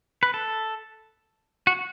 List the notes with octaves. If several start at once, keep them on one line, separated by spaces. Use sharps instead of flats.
B4
A4
F#4